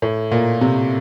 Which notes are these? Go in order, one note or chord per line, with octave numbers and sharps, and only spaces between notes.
A2
A#2
C3